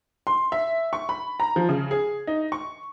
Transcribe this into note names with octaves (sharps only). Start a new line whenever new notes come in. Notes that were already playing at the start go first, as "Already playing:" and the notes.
C6
E5
C#6
B5
A#5
F3
C#3
G#4
D#4
C#6